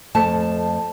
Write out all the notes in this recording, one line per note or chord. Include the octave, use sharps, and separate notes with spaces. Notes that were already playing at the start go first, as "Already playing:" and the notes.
F2 A3 A5